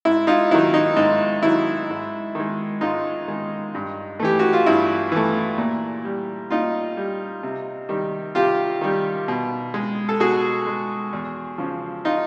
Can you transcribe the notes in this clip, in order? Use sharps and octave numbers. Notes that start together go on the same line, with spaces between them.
G#2 E4
D#4 F4
D#3 F#3 E4
D#4
G#2 D#4
D#3 F#3 E4
G#2
D#3 G#3
G#2 D#4 F4
D#3 G#3
G2
E3 A3 G4
F#4
F4
G2 E4
E3 A3
A#2
G3
A#2 D#4 F4
G3
C3
D#3 G3
C3 F4 G4
D#3 G3
B2
G#3
A4
B2 F#4 G#4
G#3
E2
C#3 F3
D#4 F4